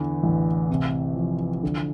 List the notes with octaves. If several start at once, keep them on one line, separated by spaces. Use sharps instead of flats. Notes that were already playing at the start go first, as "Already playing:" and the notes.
Already playing: E2 D3 E3
A1
C3
F3
D3